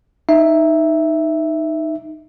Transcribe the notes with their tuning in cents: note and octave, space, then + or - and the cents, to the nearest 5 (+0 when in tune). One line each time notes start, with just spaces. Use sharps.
D#4 +0 E5 +0